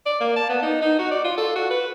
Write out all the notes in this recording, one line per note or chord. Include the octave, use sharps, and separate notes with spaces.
D5
A#3
A5
B3
D#4
D#4
F#4
D5
F4
A4
F#4
B4